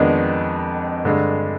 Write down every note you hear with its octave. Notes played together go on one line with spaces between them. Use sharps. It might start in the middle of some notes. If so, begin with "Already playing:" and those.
Already playing: F2 D#3 G#3 B3 D4
G2 D3 G#3 D4